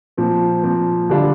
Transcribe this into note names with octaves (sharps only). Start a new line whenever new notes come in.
A#2 F3 C4
A#2 F3 C4
D3 G3 D4 F4